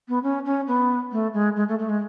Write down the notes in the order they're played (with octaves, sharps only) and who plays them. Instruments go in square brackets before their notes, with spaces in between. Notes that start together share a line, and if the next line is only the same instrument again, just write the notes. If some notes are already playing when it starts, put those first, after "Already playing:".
[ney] B3
C#4
C#4
B3
A3
G#3
G#3
A3
A3
G#3